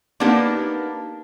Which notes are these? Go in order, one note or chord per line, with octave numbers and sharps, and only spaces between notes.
A#3 B3 D4 D#4 G4 A#4